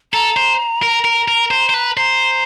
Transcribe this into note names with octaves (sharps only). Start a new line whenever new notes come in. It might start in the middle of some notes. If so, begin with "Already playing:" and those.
A4 A#5
C5
A#4
A#4
A#4
C5
C5
B4
C5 A#5